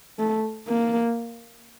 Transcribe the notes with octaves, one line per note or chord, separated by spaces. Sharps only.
A3
A#3